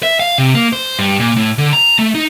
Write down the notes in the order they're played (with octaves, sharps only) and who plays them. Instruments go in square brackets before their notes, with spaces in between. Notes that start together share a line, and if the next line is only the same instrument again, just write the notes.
[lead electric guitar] E5
F5
C3
A#3
C5
G2
A#2
A2
D3
A#5
A3
D#4